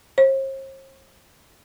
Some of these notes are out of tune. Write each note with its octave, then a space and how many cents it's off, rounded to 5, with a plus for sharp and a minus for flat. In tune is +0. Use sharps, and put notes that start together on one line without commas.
C5 +45